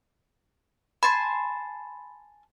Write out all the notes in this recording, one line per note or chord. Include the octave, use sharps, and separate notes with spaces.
G#5 A5 B5 C6